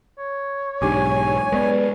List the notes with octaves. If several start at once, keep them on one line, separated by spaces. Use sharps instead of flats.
C#5
B1 G#2 D4 G4 G#5 D6
G#3 B3 B4 D5